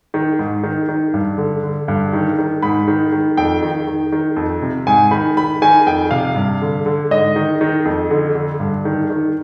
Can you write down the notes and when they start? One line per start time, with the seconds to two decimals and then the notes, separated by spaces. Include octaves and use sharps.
0.14 D#3
0.39 G#2
0.63 D#3
0.89 D#3
1.14 G2
1.38 D3
1.63 D3
1.88 G2
2.13 D#3
2.38 D#3
2.62 G#2 B5
2.88 D#3
3.12 D#3
3.37 F2 G5
3.62 D#3
3.87 D#3
4.12 D#3
4.36 F2
4.62 C3
4.87 G#2 G#5
5.11 D#3 B5
5.37 D#3 B5
5.62 D#3 G#5
5.87 F2 G5
6.11 C3 F5
6.36 G2
6.62 D3
6.86 D3
7.11 G#2 D#5
7.36 D#3
7.61 D#3
7.85 F2
8.11 D3
8.35 D3
8.60 G2
8.85 D#3
9.10 D#3